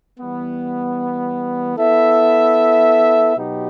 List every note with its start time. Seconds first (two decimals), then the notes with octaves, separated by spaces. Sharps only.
0.19 E3 G3 B3
1.77 B3 E4 A4 E5
3.35 B2 F#3 B3 D#4 G4